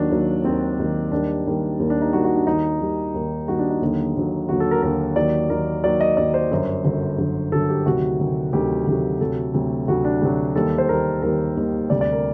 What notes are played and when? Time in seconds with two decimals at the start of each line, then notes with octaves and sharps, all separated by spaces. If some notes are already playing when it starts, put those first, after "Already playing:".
Already playing: D#2 D#3 F#3 D4
0.11 D#2 D#3 F#3
0.44 D#2 D#3 F#3 C4
0.78 D#2 D#3 F#3
1.12 D#2 D#3 G3 D4
1.46 D#2 D#3 G3
1.79 D#2 D#3 G3
1.90 D4
2.02 D#4
2.13 D#2 D#3 G3 F#4
2.24 F#4
2.36 D4
2.46 D#2 D#3 G3 D#4
2.80 D#2 D#3 G3
3.14 D#2 D#3 G3
3.48 D#2 D#3 G3 F#4
3.59 D4
3.70 D#4
3.81 D#2 D3 F#3
4.15 D#2 D3 F#3
4.49 D#2 D3 F#3 F#4
4.60 A4
4.71 A#4
4.82 D#2 D3 F#3 A#4
5.16 D#2 D#3 F#3 D5
5.50 D#2 D#3 F#3 A#4
5.84 D#2 D#3 F#3 D5
6.01 D#5
6.17 D#2 D#3 F#3 D5
6.34 C5
6.51 G1 F#2 D3 F#3
6.84 G1 F#2 D3 F#3
7.18 G1 F#2 D3 F#3
7.52 G1 F#2 D3 F#3 A4
7.69 G4
7.86 D2 C3 D#3 F#3 F#4
8.20 D2 C3 D#3 F#3
8.53 D2 C3 D#3 F#3 G4
8.87 D2 C3 D#3 F#3
9.21 D2 C3 F#3 A4
9.54 D2 C3 F#3
9.88 D2 C3 F#3 F#4
10.05 D4
10.22 D2 C3 F#3 G4
10.55 D#2 D#3 G3 A4
10.78 C5
10.89 D#2 D#3 G3 A#4
11.22 D#2 D#3 G3 A#4
11.56 D#2 D#3 G3
11.90 D2 C3 G3 D5
12.01 D5
12.13 A#4